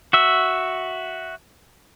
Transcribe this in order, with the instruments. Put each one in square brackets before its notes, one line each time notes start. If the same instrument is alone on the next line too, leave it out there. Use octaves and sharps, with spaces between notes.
[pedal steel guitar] F#4 E5